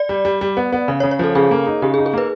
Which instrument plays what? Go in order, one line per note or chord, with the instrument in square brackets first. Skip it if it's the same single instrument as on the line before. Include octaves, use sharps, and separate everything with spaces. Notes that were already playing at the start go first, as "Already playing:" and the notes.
Already playing: [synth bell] D5
[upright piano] G3
G3
G3
B3
B3
C#3
[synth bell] C#5
[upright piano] C#3
[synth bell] C#5
[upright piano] F3 [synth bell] A4
[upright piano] C#3 [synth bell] G#4
[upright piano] A#3
D#4
[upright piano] C#3 [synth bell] G4
[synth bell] G#4
[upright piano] D#4
[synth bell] G#4
[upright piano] A#3 [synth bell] B4